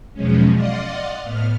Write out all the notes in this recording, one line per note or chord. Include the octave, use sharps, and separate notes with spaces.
E2 B2 F3 F#3 G#3 C#4
D5 D#5 F5 F#5 C6
A2 B3 F6